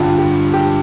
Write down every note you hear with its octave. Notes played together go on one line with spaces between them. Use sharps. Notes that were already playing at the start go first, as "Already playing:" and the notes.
Already playing: G2 D3 G3 F4
G4
G4